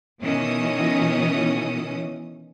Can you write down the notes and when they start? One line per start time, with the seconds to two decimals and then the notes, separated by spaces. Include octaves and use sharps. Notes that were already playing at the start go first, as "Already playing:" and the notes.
0.21 B2 D#3 E3 C#4 D#6